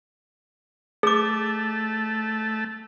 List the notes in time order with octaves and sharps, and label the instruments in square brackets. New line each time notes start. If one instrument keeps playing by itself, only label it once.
[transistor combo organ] A3 [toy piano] G#4 D6